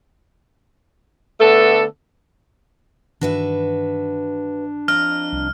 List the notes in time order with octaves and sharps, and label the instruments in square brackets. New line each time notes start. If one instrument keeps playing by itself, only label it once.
[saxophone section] D3 A3 B3 A4
[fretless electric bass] G2 D#3 E3 [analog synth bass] D4 [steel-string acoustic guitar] F#4 B4 E5
[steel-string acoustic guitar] F2 D#5 A#5 [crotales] F6
[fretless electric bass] C2